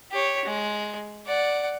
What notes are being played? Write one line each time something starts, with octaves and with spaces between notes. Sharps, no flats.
G4 C#5
G#3
D5 F#5